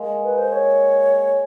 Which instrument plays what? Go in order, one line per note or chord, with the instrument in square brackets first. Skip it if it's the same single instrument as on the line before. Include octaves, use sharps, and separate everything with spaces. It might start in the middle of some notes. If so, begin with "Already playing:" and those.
Already playing: [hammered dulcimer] G#3 A#3
[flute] B4
C5
C#5